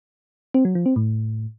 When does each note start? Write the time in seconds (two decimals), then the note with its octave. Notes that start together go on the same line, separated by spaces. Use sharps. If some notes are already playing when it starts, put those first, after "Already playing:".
0.54 C4
0.65 F#3
0.75 F3
0.86 C4
0.96 A2